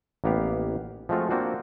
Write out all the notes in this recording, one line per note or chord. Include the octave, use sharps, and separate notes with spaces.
A1 A#3 B3 G4 F5
F3 G#3 A3 C4 F4 F#4
A#3 C4 D4 F#4 C5